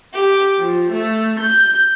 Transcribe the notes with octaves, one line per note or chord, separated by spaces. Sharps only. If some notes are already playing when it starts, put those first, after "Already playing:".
G4
F3
A3
G6